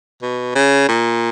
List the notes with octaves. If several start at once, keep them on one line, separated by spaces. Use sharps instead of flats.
B2
C#3
A#2